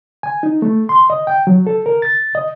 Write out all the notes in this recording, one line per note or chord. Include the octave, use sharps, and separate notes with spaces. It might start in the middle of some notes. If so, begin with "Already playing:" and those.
G#5
D#4
A3
C6
D#5
G5
F#3
A4
A#4
A6
D#5